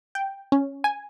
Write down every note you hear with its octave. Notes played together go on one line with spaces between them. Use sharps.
G5
C#4
G#5